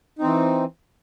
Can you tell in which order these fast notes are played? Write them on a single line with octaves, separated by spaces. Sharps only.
D#4 C4 E3